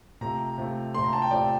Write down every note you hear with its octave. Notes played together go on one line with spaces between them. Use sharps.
C3 F3 A3 A#5
C3 F3 A3
C3 F3 A3 C6
A#5
A5
G5
C3 F3 A3 D5